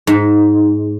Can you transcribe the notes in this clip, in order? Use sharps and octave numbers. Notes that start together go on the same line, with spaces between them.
G#2